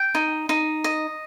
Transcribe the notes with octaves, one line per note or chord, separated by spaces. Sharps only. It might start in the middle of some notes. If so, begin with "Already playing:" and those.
Already playing: G5
D#4
D#4
D#5